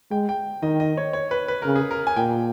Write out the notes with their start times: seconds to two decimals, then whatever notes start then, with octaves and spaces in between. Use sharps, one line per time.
0.11 G#3 G5
0.29 G5
0.63 D#3 D#5
0.80 D#5
0.97 C#5
1.13 C#5
1.31 B4
1.48 B4
1.62 C#3 A#4
1.76 G#4
1.91 A#4
2.07 G#5
2.16 A#2 G5